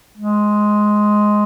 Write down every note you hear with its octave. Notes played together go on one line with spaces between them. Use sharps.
G#3